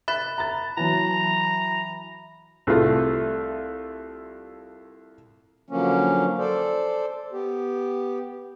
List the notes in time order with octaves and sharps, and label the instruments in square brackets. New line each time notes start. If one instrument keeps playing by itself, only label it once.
[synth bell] E5 B5 [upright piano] F#6 B6
[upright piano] A#5 A6
[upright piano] E3 F#3 [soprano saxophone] A#5
[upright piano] C2 A3 F4
[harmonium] D3 F3 F#3 A#3 C#4
A4 C5 D5
B3 G4